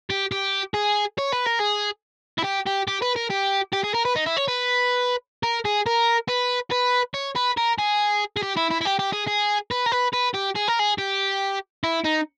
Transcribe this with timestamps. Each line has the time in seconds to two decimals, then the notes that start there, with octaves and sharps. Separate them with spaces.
0.10 G4
0.32 G4
0.74 G#4
1.18 C#5
1.32 B4
1.46 A#4
1.59 G#4
2.39 E4
2.44 G4
2.67 G4
2.88 G4
3.02 B4
3.16 A#4
3.30 G4
3.73 G4
3.84 G#4
3.94 A#4
4.05 B4
4.16 D#4
4.26 E4
4.37 C#5
4.48 B4
5.43 A#4
5.65 G#4
5.86 A#4
6.29 B4
6.72 B4
7.14 C#5
7.36 B4
7.57 A#4
7.78 G#4
8.37 G#4
8.43 G4
8.57 E4
8.70 E4
8.81 E4
8.85 G4
8.99 G4
9.13 G#4
9.27 G#4
9.71 B4
9.86 A#4
9.92 B4
10.13 B4
10.34 G4
10.55 G#4
10.68 A#4
10.79 G#4
10.98 G4
11.84 E4
12.04 D#4